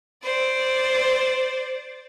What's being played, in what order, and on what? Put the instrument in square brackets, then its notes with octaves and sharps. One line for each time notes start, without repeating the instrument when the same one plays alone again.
[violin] C5 D5